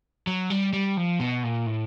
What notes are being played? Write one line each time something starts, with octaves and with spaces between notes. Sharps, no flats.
F#3
G3
G3
F3
B2
A#2
A2